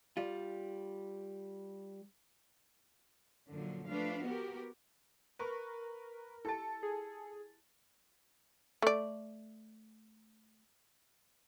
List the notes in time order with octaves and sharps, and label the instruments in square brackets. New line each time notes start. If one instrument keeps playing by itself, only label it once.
[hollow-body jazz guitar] G3 F4
[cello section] F#2 A#2 D3 F3 F#3
F3 A3 D4 B4 F5
B3 F#4 G4 A#4
[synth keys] A#4 [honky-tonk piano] B4 C#6
[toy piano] E4 G4 A5 [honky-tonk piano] A4 A6
[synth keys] G#4
[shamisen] A3 D5